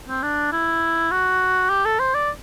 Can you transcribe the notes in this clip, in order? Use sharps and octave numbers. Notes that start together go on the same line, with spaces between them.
C4
D4
E4
F#4
G4
A4
C5
D5